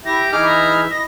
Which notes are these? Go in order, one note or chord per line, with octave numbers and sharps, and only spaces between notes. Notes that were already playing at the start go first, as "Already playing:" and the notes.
E4 G4 E5 A#6
E3 D#4 E4 G#4 D6 F6
E5 A#5
E4 D#5 A#6